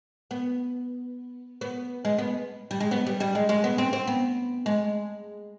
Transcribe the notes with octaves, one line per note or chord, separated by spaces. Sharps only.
B3
B3
G#3
B3
G3
G#3
B3
G3
G3
G#3
G#3
B3
C4
C4
B3
G#3